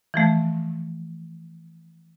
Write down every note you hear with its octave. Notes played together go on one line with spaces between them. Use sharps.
E3 F3 A3